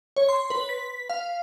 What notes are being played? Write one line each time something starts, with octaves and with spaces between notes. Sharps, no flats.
C#5
C6
B4
B6
F5